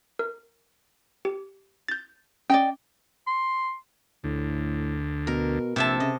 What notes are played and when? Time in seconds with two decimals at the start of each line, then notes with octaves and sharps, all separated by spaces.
0.19 A#4
1.25 G4
1.88 G6 A6
2.50 C#4 D5 D#5 G5
3.27 C6
4.24 D2 A2
5.27 B2 A#4
5.76 A#1 C3 E5 A5
6.00 C#3 D#5